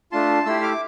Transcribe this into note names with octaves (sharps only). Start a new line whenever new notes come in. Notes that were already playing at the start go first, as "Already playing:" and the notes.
A3 D4 F4 A5 C6
A3 E4 G4 C6 E6
D6 F6